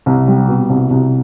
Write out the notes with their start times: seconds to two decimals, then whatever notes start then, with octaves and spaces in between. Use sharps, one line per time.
0.06 C2
0.28 G3
0.48 B2
0.70 C2
0.90 C2